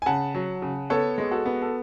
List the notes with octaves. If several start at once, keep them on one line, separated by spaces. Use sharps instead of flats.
G#5
C#3 F#5 A5
F#3
C#3
B3 A4 C#5
G#3
F#4 A4
B3
A4